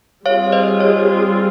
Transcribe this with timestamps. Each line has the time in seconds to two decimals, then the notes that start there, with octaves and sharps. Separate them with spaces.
0.25 G3 C4 F4 G#4 C#5 F5
0.52 C5 D#5
0.80 C#5